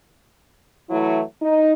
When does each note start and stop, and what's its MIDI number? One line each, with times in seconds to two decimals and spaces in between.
0.90 1.21 52
0.90 1.21 54
0.90 1.21 57
0.90 1.21 64
1.41 1.72 63